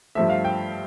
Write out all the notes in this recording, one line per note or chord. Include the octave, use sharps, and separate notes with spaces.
G2 F3 A3 E5
F5
G5